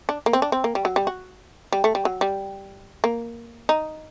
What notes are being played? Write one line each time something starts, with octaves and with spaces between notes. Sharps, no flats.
D4
A#3
C4
D4
C4
A#3
G3
F#3
G3
F#4
G3
A3
G3
F#3
G3
A#3
D#4